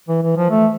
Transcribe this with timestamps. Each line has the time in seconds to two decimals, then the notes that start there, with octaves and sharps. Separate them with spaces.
0.08 E3
0.22 E3
0.37 F3
0.50 A3